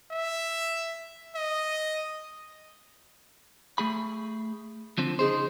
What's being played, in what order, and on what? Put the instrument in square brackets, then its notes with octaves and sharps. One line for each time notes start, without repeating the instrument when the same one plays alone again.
[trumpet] E5
D#5
[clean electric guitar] A3 G#4 B5
D3 F3 C4
[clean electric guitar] C#3 D#4 C5 [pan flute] G#4